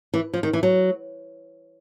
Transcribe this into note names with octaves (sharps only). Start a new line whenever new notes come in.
E3
F3
D#3
E3
F#3